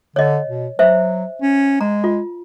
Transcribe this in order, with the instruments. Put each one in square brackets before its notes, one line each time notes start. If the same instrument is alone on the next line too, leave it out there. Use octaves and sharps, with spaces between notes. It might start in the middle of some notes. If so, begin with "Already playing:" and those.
[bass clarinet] D3 [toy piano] C#5 D#5
[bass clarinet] B2
[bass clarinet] F#3 [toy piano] C5 E5
[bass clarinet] C#4
[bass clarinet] G#3 [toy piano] A#5
[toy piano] F4